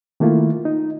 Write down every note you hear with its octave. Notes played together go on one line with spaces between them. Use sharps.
D#3 A3 A#3 E4 F4
D#4